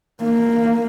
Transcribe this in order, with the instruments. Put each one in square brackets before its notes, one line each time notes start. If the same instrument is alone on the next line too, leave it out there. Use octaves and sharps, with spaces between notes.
[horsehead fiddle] A#3